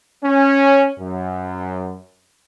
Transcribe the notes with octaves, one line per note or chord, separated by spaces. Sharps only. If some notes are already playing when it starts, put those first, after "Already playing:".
C#4
F#2